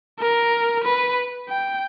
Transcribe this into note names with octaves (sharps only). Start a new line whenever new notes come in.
A#4
B4
G5